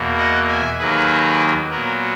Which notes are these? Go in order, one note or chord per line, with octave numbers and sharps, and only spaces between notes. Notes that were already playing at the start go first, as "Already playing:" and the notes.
Already playing: E2 B2 A#3
D#5 F#5
E5 G#5
D#2 D#3 F#3 A#3 G#4 B4
A#2 F#3 B3 F#4 A#4